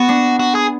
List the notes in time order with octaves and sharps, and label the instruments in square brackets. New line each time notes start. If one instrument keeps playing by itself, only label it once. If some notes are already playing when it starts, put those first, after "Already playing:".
Already playing: [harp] B3 [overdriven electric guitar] F#4
[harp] D4
[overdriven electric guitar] F#4
G#4